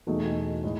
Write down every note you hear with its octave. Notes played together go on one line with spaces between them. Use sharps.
E2 B2 A3 D#4 G#4
A2 G#3